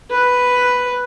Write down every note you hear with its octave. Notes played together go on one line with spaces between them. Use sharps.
B4